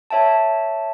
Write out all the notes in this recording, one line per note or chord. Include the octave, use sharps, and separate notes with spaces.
C#5 E5 G5 A5